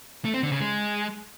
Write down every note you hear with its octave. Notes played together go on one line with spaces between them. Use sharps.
A3
C4
D3
C#3
G#3